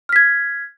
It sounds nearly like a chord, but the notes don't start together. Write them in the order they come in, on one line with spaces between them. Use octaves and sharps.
F6 B6 G#6